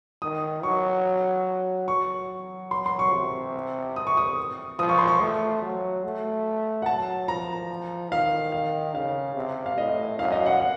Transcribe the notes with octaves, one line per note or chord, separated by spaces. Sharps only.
D#3 D#6
F#3 C#6
F#3 C#6
C6
C6
C#6
C3
D#6
C#6
D#6
F3 D#6
C#6
C6
C#6
A3
F#3
A3
F#5
F#3 A5
F3 A#5
D#3 F5
F5
C#3 F5
C3
F5
A2 D#5
F#2 F5
D#5
F5
F#5
F#5